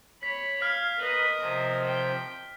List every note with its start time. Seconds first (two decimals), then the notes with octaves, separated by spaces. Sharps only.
0.23 C#5 B5 B6
0.62 F5 F6 G#6 B6
0.99 A#4 B4 D#5 B5
1.40 C3 F3
1.85 G5